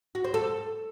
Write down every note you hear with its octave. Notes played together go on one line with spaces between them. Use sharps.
F#4
C5
A4